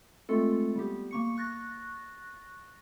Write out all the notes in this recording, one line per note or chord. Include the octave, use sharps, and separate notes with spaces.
G#3 A3 C4 F4 A4
G3 B3 G4
A#3 C#6 C#7
C#6 F#6 A6 A#6